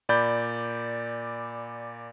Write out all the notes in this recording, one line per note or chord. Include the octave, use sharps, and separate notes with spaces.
A#2 D5 B5 G6